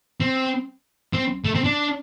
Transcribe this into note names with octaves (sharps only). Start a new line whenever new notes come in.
C4
C4
A3
C4
D4